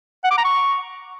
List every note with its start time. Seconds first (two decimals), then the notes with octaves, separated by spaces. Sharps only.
0.24 F#5
0.31 D6
0.38 A#5
0.44 C#6